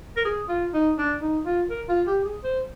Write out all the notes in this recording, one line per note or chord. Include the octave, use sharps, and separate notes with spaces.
A#4
G#4
F4
D#4
D4
D#4
F4
A#4
F4
G4
G#4
C5